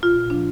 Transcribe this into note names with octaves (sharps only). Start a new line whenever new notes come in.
A#2 F4
A#2
F3 D4